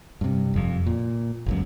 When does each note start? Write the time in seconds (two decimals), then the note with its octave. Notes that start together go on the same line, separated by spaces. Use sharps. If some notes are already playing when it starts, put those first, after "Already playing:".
0.21 G2 C3
0.54 F1 F2
0.87 A#2
1.46 G1 C#2 F#2